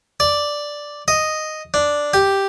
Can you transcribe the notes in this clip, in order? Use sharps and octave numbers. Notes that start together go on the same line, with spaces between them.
D5
D#5
D4
G4